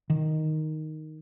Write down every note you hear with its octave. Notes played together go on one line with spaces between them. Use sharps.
D#3